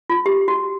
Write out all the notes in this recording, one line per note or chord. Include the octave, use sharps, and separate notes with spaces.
F4
G4
F#4